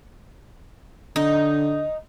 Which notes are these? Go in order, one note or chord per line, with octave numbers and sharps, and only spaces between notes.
D3 D#4